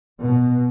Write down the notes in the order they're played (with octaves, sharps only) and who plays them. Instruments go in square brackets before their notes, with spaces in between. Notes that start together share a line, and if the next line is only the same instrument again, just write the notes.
[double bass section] B2